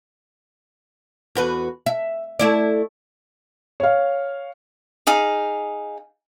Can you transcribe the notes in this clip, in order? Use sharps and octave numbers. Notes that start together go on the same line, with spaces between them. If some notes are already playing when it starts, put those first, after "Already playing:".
E2 F#4 B4
E5
A3 E4 D5
C#5 F5
D#4 G#4 F5